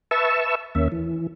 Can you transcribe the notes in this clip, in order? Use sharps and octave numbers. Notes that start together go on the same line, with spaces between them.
B4 E5 A5 C#6 E6
D#2 A#3 C#4 E5
E3